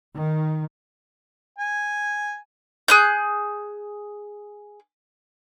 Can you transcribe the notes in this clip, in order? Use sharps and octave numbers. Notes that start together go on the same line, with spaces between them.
D#3
G#5
G#4 F#6 G6